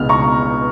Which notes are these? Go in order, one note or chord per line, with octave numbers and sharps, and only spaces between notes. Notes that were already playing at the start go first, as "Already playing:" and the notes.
Already playing: C#2 B2 G#3 B3 F6
A#5 C#6